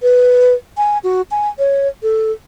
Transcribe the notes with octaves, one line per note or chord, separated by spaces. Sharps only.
B4
G#5
F#4
G#5
C#5
A4